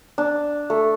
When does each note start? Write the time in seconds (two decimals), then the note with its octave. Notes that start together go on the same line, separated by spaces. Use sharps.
0.18 D4
0.70 A3